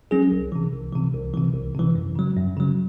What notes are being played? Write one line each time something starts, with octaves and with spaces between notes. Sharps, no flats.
F#3 C#4 G#4
C2
C3 E3
C2
C3 E3
C2
C3 E3
C2
C3 E3
F#2
C#3 F#3
F#2
C#3 F#3